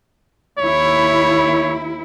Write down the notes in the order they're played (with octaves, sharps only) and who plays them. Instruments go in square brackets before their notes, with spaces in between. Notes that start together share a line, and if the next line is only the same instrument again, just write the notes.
[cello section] D#2 E4 [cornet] C#5